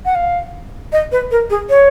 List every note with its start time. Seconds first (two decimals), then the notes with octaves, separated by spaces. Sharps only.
0.05 F#5
0.15 F5
0.92 D#5
1.12 B4
1.31 A#4
1.50 G#4
1.69 C#5